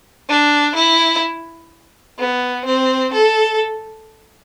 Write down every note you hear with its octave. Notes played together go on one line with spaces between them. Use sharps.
D4
E4
B3
C4
A4